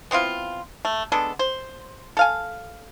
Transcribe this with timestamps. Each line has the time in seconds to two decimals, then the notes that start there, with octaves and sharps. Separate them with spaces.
0.11 B3 C4 E4 F4
0.85 A3
1.12 G#3 B3 D4 A4
1.39 C5
2.17 A4 F5 G#5